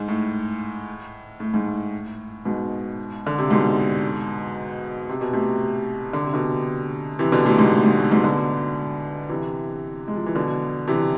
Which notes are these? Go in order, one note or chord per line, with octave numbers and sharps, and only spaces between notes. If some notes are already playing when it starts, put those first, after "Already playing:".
Already playing: G#2
A2
A2
G#2
A2
G#2 B2
D3
C3
G#2 B2
C3
B2
A2 C3
D3
C3
B2 D3
C3 E3
B2 D3
A2 C3
G#2 B2
A2
G#2
A2
G#2 B2
B2 D3
C3 E3
G#3
F3
E3
B2 D3
C3 E3